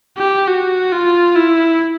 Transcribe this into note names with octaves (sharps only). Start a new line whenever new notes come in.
G4
F#4
F4
E4